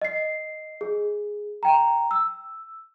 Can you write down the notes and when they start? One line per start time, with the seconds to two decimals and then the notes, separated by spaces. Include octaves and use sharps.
0.02 D#5 C7
0.81 G#4
1.63 G5 A#5
2.11 E6